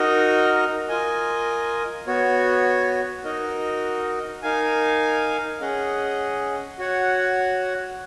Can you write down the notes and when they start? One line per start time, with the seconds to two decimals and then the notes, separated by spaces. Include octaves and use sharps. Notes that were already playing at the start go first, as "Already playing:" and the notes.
Already playing: D#4 F#4 A#4 D#5
0.89 F4 A#4 D#5 G#5
2.07 B3 F#4 C#5
3.24 D#4 F#4 A#4 D#5
4.42 D#4 A#4 F5 G#5
5.61 C#4 G#4 D#5 F#5
6.79 F#4 C#5 F#5